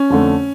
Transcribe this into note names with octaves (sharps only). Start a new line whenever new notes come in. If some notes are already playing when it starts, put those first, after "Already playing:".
Already playing: C#4
F2 D3 A3